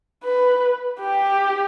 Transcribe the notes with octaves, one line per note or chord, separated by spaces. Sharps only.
B4
G4